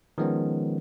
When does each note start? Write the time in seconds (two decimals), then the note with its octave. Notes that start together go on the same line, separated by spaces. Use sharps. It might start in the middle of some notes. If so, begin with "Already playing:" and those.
0.18 D#3 F3 G#3 B3 C#4